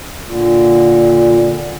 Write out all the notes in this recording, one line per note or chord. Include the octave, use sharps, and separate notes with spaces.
A#2 D3